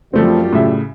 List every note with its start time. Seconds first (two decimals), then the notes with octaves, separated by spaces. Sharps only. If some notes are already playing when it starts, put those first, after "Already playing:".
0.13 F#2 F3 G3 A3 C4 F4
0.53 A2 C#3 E5